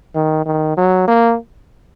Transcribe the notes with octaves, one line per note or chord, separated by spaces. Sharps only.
D#3
D#3
F#3
A#3